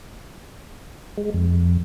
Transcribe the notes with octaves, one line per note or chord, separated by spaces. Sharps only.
G#3
F2